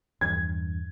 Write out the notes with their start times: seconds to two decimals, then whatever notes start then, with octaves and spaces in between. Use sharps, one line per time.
0.21 E2 G2 G#6